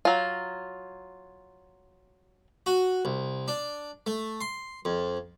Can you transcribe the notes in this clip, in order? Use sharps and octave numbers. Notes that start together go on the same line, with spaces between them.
F#3 F4
F#4
C2
D4
A3
C6
F2